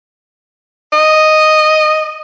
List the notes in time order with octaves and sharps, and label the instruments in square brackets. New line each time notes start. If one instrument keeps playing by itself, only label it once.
[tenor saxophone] D#5